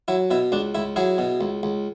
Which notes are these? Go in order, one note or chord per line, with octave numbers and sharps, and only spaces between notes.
F#3 E4
B2 E4
C#2 D4
C#2 E4
F#3 E4 G#4
B2
C#2
C#2